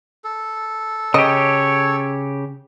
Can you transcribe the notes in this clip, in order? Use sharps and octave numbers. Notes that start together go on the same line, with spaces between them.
A4
C#3 G4 C#5 D#5